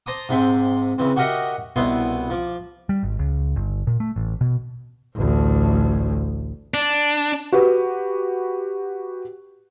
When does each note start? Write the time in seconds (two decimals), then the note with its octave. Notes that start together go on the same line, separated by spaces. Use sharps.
0.06 C5 A5 A#5 D6 D#6
0.29 G#2 C3 E5 G5 C6
0.98 C#3 E3 C4
1.16 F#4 G4 A#4 D#5 E5 F#5
1.76 C2 B2 B3 E4 C6
2.30 F3 D6
2.89 G3
3.03 G#1
3.19 C#2
3.56 G1
3.87 A#2
4.00 A3
4.16 A1
4.41 B2
5.15 A1 D2
6.74 D4
7.52 F#4 G4 B4